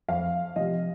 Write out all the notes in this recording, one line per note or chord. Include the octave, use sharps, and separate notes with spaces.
F2 F5
C3 F3 D#5